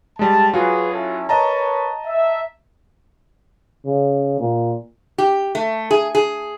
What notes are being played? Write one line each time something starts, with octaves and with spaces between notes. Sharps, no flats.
G3 G#3 A5
F#3 F4 F#4 G#4 B4
C#4 E4 A4
A#4 B4 C#5 D#5 A5 A#5
E5
C#3
A#2
G4
A3
G#4
G#4